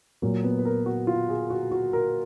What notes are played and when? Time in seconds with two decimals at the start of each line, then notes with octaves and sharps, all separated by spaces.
0.22 A#2 F#3 A#3
0.44 B3
0.59 B4
0.65 A#4
0.86 F#4
1.07 F4
1.29 G#4
1.50 F#4
1.71 F#4
1.93 A#4